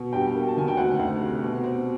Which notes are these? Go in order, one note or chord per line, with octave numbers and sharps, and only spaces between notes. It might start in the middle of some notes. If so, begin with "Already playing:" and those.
Already playing: B2
G2 G4 G5
A#3
A5
D#3 G#5
G5
D2 F#4 F#5
D2
C3
B2
C4